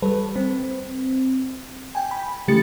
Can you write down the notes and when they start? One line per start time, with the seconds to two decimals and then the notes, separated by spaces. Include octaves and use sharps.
0.02 G3 A4 B4
0.36 C4
1.95 G5 G#5
2.11 B5
2.48 C#3 E3 A3 G4 A6 C#7